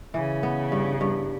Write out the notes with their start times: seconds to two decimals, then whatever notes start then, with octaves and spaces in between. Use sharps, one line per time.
0.14 C#3 E3
0.43 B3
0.72 G2
1.01 G2